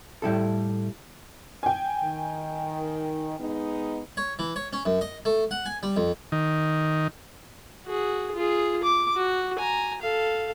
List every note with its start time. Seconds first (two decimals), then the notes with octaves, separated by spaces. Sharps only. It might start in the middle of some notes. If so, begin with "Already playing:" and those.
0.22 A2 G3 E4 A4
1.63 G5 G#5
2.02 D#3
3.39 G#3 B3 D#4
4.17 C#5
4.39 E3
4.56 C#5
4.73 C#4
4.86 F#2
5.01 D#5
5.25 A3
5.51 F#5
5.66 G#5
5.83 G3
5.96 F2
6.32 D#3
7.86 F#4 G#4
8.35 F4 G#4
8.83 D6
9.16 F#4
9.59 G#5 A#5
10.02 A4 F5